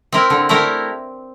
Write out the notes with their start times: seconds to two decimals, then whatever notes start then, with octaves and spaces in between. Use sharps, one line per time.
0.12 C4 E4 A#4
0.30 D3
0.49 A3 E4 G4 A#4